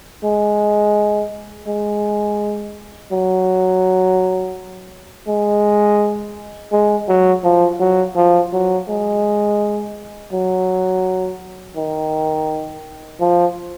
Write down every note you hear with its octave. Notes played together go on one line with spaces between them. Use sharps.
G#3
G#3
F#3
G#3
G#3
F#3
F3
F#3
F3
F#3
G#3
F#3
D#3
F3